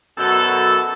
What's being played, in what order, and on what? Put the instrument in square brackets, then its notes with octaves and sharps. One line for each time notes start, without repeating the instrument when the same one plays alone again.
[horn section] F#2 B2 F#3 A4